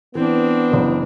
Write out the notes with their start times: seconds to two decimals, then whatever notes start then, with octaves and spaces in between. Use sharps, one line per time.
0.15 E3 B3 C4 D4
0.72 F#1 E3